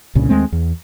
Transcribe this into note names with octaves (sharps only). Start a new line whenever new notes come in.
C2 G2 A#2 C#3
D#2 G#3 A3 C4
E2